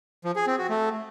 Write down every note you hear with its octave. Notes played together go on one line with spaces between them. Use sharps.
F3
G#4
C4
F#4
A3